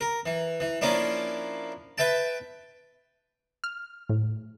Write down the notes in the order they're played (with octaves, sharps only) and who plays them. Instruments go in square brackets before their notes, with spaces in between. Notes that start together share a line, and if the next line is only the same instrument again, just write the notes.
[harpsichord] A#4
E3
E3
F3 A#3 C#4 D4 E4
B4 E5 G5 A5
[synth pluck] F6
A2